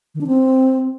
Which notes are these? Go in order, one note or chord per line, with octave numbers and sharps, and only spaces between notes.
D#3
D4
C4